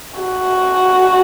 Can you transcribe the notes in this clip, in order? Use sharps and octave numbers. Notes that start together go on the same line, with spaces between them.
F#4